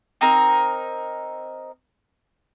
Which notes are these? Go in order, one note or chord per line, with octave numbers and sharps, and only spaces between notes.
C4 D#4 A#4